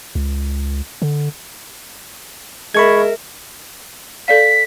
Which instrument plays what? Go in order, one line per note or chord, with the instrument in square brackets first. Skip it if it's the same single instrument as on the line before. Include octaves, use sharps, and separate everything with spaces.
[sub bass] C#2
D3
[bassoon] G#3 [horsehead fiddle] A#4 E5 [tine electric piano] B5 C#6 G#6
[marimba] A4 D5 F5 [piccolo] B6